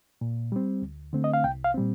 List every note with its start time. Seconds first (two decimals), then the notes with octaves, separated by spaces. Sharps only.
0.21 A#2
0.52 G3 C4
0.82 D2
1.13 D3 A3 C4
1.24 D#5
1.34 F5
1.44 C2 G5
1.64 F5
1.74 A#2 G3 C4